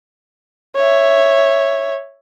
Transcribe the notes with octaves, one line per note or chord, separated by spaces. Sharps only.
C#5 E5